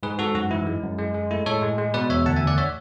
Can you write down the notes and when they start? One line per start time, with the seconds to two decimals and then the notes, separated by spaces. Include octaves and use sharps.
0.03 G#2 G#4 B4
0.19 G#2 F#4 A4
0.35 F#2 F#4
0.51 E3 E4
0.67 G#3
0.83 F#2
0.98 G#3
1.14 G#3
1.31 A3 E4
1.46 A2 A4 C#5
1.62 G#3
1.78 G#3
1.94 B2 B4 D5
2.10 E2 C#5 E5
2.26 D2 F#5 A5
2.36 E5 G#5
2.41 D2
2.47 D5 F#5
2.58 C#5 E5